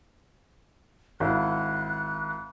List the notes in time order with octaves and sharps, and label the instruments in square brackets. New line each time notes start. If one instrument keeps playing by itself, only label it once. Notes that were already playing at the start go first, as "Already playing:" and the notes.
[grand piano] G#1 E4 F5 [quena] F#6